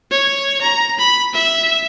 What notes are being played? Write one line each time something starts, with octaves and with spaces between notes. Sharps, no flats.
C#5
A#5
B5
E5